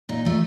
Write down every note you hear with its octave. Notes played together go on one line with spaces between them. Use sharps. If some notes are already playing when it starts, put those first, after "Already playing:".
A#2 D#4
F3 A3